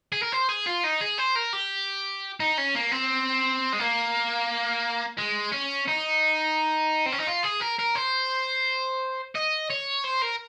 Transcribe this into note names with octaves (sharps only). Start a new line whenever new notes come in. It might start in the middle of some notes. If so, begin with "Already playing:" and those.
G#4
A#4
C5
G#4
F4
D#4
G#4
C5
A#4
G4
D#4
C#4
A#3
C4
G#3
A#3
G#3
C#4
D#4
C4
C#4
D#4
F4
G#4
A#4
A#4
C5
D#5
C#5
C5
A#4